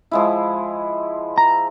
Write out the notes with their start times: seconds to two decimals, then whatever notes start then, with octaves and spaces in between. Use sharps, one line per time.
0.11 F3 G#3 E4
1.38 A#5